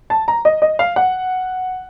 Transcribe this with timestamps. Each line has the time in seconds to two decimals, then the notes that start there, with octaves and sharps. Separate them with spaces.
0.10 A5
0.28 A#5
0.45 D#5
0.62 D#5
0.79 F5
0.96 F#5